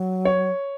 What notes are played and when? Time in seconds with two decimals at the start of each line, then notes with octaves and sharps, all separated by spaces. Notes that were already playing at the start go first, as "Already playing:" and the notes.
Already playing: F#3
0.25 C#5